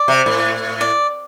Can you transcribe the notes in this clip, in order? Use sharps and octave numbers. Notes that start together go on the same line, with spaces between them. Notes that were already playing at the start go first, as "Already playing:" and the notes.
Already playing: D5
C3
A2
D5